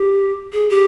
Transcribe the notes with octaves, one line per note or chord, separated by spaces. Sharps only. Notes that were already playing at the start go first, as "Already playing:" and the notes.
Already playing: G4
G#4
G4